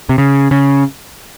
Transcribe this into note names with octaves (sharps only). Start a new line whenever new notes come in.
C3
C#3
C#3